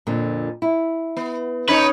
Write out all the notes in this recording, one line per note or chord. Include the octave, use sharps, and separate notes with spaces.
F2 A#2 D3
E4
B3
C#4 D#4 B4 C#5